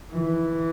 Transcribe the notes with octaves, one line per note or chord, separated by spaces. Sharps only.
E3